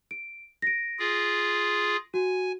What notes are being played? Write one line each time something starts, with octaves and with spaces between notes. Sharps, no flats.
D7
A#6 D7
F4 G#4
F#4 G#5